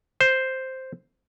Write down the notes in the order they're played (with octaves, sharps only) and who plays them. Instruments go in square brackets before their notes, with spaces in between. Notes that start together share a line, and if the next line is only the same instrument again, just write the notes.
[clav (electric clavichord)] C5